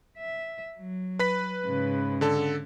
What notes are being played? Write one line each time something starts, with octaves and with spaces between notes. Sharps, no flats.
E5
F#3
B4 B5 B6
G#2 C#3
D3 A4